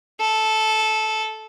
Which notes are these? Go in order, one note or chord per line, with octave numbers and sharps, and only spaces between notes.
A4